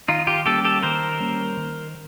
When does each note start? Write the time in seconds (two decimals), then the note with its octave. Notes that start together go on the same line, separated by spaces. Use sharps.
0.08 D#3 D#4 F4
0.27 F4 G4
0.46 G3 A#3 C#4 G4 A4
0.65 G4 A4
0.83 D#3 A#4 C5
1.20 G3 A#3 C#4
1.57 D#3